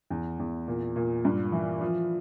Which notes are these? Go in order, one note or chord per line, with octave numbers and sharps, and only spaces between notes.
E2
E2
A#2
A#2
G2
E3
F3